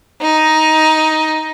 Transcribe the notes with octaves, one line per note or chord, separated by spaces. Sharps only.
D#4